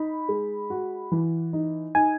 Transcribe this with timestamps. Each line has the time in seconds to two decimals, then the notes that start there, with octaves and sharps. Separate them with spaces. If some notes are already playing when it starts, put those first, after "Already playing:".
Already playing: D#4 B5
0.29 G#3
0.70 F#4
1.12 E3
1.53 D#4
1.95 D#4 G#5